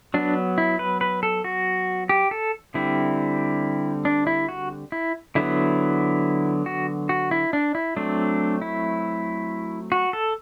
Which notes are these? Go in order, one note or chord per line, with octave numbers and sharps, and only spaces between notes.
F#3 B3 D4
E4
B4
B4
A4
F#4
G4
A4
D3 G3 C4 E4
D4
E4
F#4
E4
D3 F#3 B3 E4
F#4
F#4
E4
D4
E4
F#3 A3 C4 D4
E4
F#4
A4